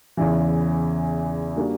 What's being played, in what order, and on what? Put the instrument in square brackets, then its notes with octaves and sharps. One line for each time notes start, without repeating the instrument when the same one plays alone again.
[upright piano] E2 C#3 E3
G3 A#3 D4 F#4